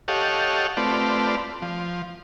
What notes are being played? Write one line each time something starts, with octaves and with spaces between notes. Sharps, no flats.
G4 A4 C#5 D#5 F5 F#5
A3 C4 F4 B4 D5
F3